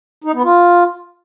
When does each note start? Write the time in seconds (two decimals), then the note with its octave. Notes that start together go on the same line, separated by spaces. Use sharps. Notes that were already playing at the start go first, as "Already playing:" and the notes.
0.24 D#4
0.34 B3
0.44 F4